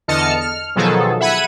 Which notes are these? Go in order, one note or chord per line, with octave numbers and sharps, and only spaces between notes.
E2 D3 D#5 A5 F6 C#7
F6
B2 D#3 F3 F#3 G#4 A4
E5 F#5 B5 G#6 D#7